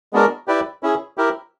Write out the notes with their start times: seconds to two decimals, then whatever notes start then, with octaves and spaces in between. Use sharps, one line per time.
0.13 G#3 B3 D4 F#4 A#4
0.48 E4 G4 B4 D5
0.83 C#4 E4 G#4
1.18 E4 G4 A#4